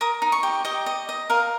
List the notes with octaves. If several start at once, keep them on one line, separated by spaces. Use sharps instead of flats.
A#4 D#6
D#4
C#6
G4
G4 D#5
D#5
D#5
A#4 F5